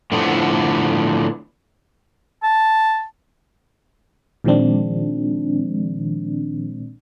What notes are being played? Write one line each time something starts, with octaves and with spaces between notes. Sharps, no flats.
A2 D3 F3 B3 D4
A5
A#2 D#3 F3 G#3 C4 D4